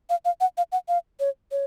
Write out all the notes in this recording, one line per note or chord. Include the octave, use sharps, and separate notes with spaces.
F5
F5
F#5
F5
F#5
F5
C#5
C#5